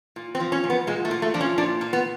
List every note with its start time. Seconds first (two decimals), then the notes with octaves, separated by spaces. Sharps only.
0.16 A#2
0.35 C4
0.40 F3
0.52 C#4
0.64 A#2
0.70 B3
0.87 A#2 G#3
1.05 A3
1.11 A#2
1.22 A3
1.34 F3 D4
1.41 C#4
1.58 A#2 D4
1.81 A#2
1.93 B3